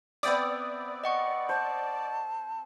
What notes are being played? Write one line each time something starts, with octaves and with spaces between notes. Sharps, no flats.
B3 C4 D5 E5 D#6
D#5 F#5 C#6
C5 A5